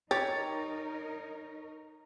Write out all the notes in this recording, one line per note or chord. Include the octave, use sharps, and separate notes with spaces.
D#4 G4 A#4 C#5 A6